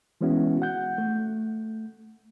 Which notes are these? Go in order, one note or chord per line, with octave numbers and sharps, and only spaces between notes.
E3 G#3 B3 C#4 E4 F#4
F#5 G6
A3